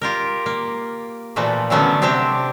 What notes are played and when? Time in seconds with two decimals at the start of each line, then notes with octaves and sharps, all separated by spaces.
0.02 F4 G4 A#4
0.46 A#3
1.36 A#2 E3 F3 A3 F#4
1.70 D3 E3 F#3 A3 B3 C#4
2.02 C3 C4 D4 G4 E5 A#5